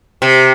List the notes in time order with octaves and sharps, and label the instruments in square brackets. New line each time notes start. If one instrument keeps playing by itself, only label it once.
[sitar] C3